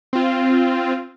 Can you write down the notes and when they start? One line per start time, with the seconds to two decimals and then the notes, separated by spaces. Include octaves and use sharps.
0.13 C4 F4